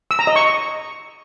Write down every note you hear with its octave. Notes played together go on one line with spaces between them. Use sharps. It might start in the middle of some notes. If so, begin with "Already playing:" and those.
E6
A#5
D#5
C#6